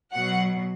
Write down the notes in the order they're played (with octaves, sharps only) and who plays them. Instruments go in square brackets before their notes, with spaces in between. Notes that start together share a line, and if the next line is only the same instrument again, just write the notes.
[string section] B2 F#3 F#5